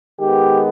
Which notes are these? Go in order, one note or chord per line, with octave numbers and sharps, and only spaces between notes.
D#3 G#3 B3 G4